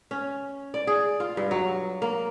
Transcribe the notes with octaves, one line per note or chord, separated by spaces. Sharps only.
C#4
D5
G#4
F4
G2
F#3
A#3